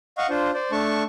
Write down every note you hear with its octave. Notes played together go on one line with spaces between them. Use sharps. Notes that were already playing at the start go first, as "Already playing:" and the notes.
D#5 F5 F#5 C#6
D4 F4 C5
C5 D5
A3 D4 A5 C#6